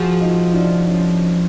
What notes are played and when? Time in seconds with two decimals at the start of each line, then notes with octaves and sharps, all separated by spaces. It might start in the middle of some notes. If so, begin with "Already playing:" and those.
Already playing: F3 F#4 G#4
0.21 D#4 F4
0.53 D4 E4
0.86 C#4 D#4